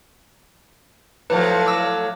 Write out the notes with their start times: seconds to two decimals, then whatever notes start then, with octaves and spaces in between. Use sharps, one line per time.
1.30 A2 F3 F#3 B4
1.66 D6 E6